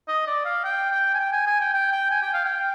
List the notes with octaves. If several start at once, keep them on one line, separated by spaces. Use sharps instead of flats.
D#5
D5
F5
G5
G5
G#5
G5
G#5
G#5
G5
G5
G5
G#5
G5
F5
G5